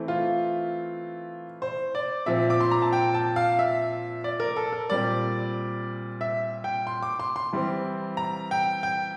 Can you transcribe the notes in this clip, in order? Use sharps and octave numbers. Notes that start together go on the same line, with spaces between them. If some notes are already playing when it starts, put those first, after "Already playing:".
Already playing: E3 A3 C4
F4
C5
D5
A#2 F3 C4 E5
D6
C6
A#5
A5
G5
A5
F5
E5
D5
A#4
A4
A#4
A#2 G3 C4 D5
E5
G5
C6
D6
C6
C6
E3 G3 C4
A#5
G5
G5